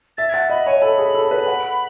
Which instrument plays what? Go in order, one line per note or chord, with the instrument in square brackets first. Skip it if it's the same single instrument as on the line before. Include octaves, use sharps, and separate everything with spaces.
[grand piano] E5 [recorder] A6
[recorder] G#6
[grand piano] F#5 [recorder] A6
[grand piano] D#5 [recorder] B5
[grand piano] C#5 [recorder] G#5
[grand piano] A4 [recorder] B5
[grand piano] G#4
[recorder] B5
[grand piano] A4
[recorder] B5
[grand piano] B4
F#5